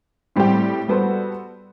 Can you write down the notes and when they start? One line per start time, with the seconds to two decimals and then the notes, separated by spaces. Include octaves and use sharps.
0.36 A2 G3 C4 G4
0.88 G3 B3 F#4 A4 C5